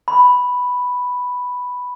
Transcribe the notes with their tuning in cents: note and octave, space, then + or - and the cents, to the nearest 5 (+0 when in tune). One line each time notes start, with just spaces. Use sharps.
B5 +0